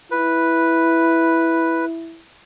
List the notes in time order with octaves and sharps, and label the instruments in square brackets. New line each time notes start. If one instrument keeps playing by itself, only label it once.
[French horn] E4 [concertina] B4